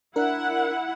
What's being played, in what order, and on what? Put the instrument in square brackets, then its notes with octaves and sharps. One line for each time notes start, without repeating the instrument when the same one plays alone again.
[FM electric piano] D4 A#4 [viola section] E4 F#5